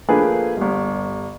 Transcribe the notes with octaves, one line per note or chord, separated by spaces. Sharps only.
F3 A3 A#3 D4 G#4 B4
G1 G2